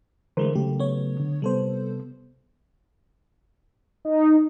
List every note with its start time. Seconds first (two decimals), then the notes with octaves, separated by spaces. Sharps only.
0.37 D3 E3 G#3 A3 A#4 C5
0.55 C#3 F#3 A3 G4
0.79 B3 C#5
1.20 D3
1.42 C3 G3 B3 A4 C5
4.05 D#4